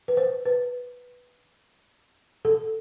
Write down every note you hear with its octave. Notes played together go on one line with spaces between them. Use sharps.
B4
C5
B4
A4